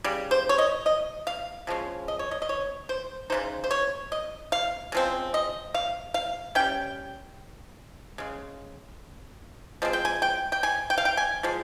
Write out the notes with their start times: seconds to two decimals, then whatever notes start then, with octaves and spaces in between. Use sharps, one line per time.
0.04 C#3 G3
0.31 C5
0.49 C#5
0.58 D#5
0.86 D#5
1.27 F5
1.67 C#3 F3 G#3 C#4
2.08 D#5
2.19 C#5
2.31 D#5
2.42 D#5
2.49 C#5
2.89 C5
3.30 C#3 G#3 D#4 C5
3.64 C5
3.71 C#5
4.12 D#5
4.52 F5
4.92 C#3 F3 G#3 C4
5.34 D#5
5.74 F5
6.14 F5
6.55 G3 C#4 G5
8.18 C#3 G#3
9.82 F3 G#3 C4
9.93 G5
10.05 G#5
10.22 G5
10.52 G5
10.63 G#5
10.90 G5
10.98 F5
11.05 G5
11.17 G#5
11.43 F3 G#3